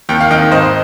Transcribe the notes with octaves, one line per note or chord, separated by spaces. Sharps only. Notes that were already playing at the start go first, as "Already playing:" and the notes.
D#2 G5
F5
D#3 D#5 G5
G#1 C5 D#5